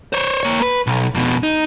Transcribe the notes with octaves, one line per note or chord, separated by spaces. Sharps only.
C5 C#5
A#3 C#5
B4
B1
F2 B2
D#4